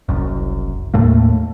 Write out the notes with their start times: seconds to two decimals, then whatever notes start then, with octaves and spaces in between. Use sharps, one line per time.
0.09 F#1 C2 F#2
0.94 D#2 A2 A3 A#3